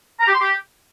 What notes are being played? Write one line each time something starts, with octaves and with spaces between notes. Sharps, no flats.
A#5
G4
C6
G4